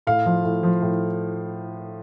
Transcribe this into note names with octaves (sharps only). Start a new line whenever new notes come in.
A2 F5
F3
A2
F3
A2